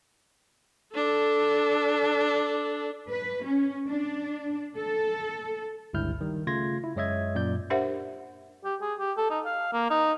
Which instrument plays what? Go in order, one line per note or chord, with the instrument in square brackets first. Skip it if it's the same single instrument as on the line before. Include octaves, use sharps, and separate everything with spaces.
[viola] D4 A4
[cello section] B4
C#4
D4
A4
[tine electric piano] G1 C#2 G2 E4 F6 G6
D#3 G3
C#3 A3 F4 C6 G#6 A#6
E4
F#2 G#3 C#5 D#5 E5 G#6
F#2 A#2 D5 G6
[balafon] D4 G4 A#4 C5 E5 F#5
[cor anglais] G4
G#4
G4
A4
D#4
F5
A#3
D#4